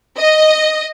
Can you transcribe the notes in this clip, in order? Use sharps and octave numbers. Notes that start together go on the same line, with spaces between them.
D#5